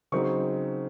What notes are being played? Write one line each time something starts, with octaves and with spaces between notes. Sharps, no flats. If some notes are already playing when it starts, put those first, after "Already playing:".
C#3 F#3 C4 D#4 C#6